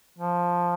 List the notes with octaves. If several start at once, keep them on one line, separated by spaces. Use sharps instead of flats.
F3